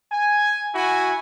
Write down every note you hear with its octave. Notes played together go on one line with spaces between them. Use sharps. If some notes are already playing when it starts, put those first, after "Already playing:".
G#5
E4 F#4 G#5